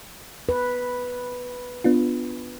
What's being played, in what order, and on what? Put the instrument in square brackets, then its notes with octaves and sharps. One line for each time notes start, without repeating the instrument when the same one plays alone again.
[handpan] B4
[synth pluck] B3 D4 F4